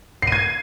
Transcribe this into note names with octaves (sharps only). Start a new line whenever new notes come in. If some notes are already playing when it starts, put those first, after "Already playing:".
G#6 C7 D#7